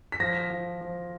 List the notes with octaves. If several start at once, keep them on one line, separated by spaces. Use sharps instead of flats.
B6
F3 A#6
F3
F3